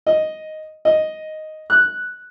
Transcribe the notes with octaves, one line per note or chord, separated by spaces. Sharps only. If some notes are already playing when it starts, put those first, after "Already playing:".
D#5
D#5
F#6